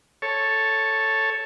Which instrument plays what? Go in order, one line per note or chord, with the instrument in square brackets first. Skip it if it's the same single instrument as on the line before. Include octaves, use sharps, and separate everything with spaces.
[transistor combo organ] A4 C#5